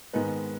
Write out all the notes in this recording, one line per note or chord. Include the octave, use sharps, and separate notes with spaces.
G#2 D#3 G#3 B3 D#4